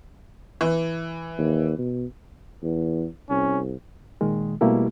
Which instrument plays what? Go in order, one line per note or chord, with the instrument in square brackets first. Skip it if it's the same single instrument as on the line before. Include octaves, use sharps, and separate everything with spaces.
[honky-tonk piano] E3
[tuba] D#2
B2
E2
[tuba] C2 [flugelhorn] C#4
[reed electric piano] A#2 D#3 G#3
B2 G3 A3 A#3 E4 G4